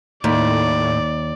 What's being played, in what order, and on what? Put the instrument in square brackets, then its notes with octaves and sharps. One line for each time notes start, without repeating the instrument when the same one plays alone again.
[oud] D#2 [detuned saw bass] A2 [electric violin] D5